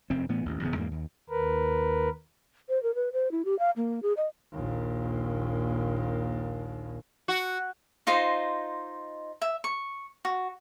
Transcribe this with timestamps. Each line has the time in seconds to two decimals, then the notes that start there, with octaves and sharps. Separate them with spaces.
0.10 F1 F#2 C4
0.29 A2 E3 B3
0.46 A1 D#2
0.62 D1 E2 C#3 B3
0.76 E2 G#2 G#3 A#3
0.91 D#2
1.30 D#2 A#4 B4
2.69 C5
2.83 A#4
2.95 B4
3.13 C5
3.31 E4
3.45 G4
3.59 F5
3.76 A#3
4.02 G#4
4.17 D#5
4.53 A#1 D#2
7.28 F#4
8.07 D#4 F4 C5 D#5
9.42 E5
9.64 C#6
10.25 F#4